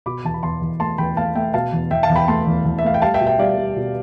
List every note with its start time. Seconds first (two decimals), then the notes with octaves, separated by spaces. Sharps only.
0.06 B2 B5 D6
0.24 E2 A5
0.34 B5
0.43 E2 A5 C6
0.61 E2
0.80 A3 A5 C6
0.98 E2 G5 B5
1.17 A3 F5 A5
1.35 A3 E5 G5
1.54 B2 F5 A5
1.73 E2
1.91 E2 E5 G5
2.03 F5 A5
2.09 E2
2.16 G5 B5
2.28 A3 A5 C6
2.47 E2
2.65 E2
2.78 E5
2.84 A3 F5
2.94 G5
3.02 G3 F5 A5
3.14 E5 G5
3.21 B2
3.27 E5 G5
3.39 G3 D5 F5
3.58 G3
3.76 B2